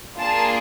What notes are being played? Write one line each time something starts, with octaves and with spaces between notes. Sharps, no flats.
A#3 D4 F4 G#4 A5